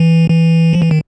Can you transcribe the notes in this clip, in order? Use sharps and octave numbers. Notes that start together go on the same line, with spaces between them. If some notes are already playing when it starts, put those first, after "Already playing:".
Already playing: E3
E3
F3
E3
D#3